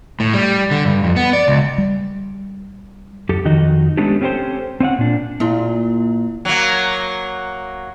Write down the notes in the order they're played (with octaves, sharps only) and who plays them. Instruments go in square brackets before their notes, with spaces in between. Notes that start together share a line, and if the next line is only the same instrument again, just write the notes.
[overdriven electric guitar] A2
G3
D3
G2
F2
B3
D5
C#2
[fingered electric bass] G3
[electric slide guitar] F#2 G4 A4
F2 D#3 D#4 F#4 D#5
G#3 A3 B3 C#4 D4 G4
C4 C#4 G4 A4 C5 G5
C4 C#4 F5 F#5
A#2 D4
[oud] A#2 F4 [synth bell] A#3 E4
[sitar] F#3 A#3